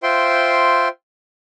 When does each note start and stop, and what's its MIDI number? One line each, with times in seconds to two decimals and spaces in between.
0.03 0.88 65
0.03 0.88 72
0.03 0.88 76
0.03 0.88 79
0.03 0.88 84